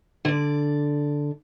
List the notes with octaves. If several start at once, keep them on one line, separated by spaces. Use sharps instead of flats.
D3 D5